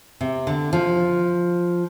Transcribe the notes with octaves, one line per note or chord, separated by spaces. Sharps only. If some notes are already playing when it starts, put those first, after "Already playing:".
C3
D3
F3